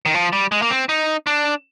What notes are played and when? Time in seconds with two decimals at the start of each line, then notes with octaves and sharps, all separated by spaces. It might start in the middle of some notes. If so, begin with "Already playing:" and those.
0.06 D#3
0.14 F3
0.33 G3
0.52 G#3
0.62 A#3
0.70 C4
0.89 D#4
1.27 D4